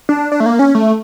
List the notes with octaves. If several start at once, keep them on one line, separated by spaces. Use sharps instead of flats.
D4
D4
A3
A#3
C#4
A3